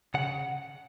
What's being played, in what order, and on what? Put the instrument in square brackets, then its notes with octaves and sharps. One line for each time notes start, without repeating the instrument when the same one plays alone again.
[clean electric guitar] C#3 F#5